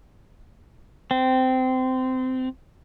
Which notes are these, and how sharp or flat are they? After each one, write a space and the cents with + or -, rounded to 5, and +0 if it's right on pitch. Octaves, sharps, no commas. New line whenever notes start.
C4 -20